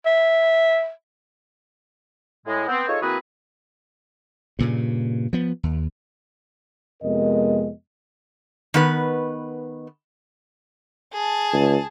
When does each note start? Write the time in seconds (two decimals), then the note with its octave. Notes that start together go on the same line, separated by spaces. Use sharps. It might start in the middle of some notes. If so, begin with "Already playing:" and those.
0.06 E5
2.46 A2 G#3
2.68 B3 C4
2.88 D#4 F4 G#4 A4 C#5
3.02 E3 A#3 C4 F#4 G#4 B4
4.59 G2 A#2 C#3
5.33 F3 B3
5.63 D#2
7.03 F2 C3 G#3 B3 A#4 D#5
8.74 D#3 B3 B4
11.13 G#4 A5
11.54 C#2